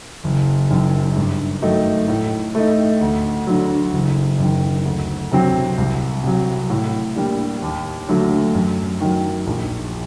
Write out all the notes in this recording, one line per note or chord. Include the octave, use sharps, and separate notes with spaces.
F#1
F#2 D#3
G2
D#3 F#3 A3 D#4
A2
A3 D#4
D2
D3 F#3
F#1
F#2 D#3
D2
C3 F#3 C4
C2
C3 F#3
A2
G3 A#3 D4
D#2
D3 F#3 A3
F#2
D#3 F#3
A#1